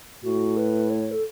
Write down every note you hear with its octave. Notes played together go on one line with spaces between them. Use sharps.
A2 F#4
B4
C#5
A4